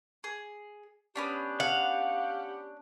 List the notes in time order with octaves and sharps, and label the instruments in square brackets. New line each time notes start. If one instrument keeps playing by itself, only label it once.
[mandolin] G#4
[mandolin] B3 C#4 D4 [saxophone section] G4
[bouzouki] F5 [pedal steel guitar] F#5